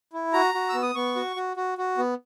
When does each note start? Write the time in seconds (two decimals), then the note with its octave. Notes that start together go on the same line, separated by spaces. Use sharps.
0.13 E4
0.33 F#4 A#5
0.54 F#4
0.69 B3 E6
0.82 D#6
0.95 B3 C#6
1.16 F#4
1.36 F#4
1.57 F#4
1.78 F#4
1.98 B3